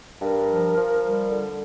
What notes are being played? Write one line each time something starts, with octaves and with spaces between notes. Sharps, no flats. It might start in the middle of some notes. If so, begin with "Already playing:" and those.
G2 A#4
F3
F3
G3
D3